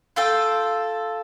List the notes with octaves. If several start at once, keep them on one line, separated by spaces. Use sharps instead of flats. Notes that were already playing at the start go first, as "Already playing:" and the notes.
F4 A4 G5